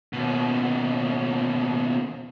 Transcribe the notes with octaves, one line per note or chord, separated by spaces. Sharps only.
D#2 B2